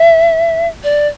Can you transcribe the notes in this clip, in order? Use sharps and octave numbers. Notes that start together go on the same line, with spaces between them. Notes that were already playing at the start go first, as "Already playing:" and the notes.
Already playing: E5
D5